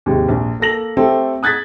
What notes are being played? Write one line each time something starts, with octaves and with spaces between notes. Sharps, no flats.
D#2 G#2 C3
A#1
A#3 A4 A#6 F#7
A3 C4 G4 A4
D#6 F#6 G#6 A6 B6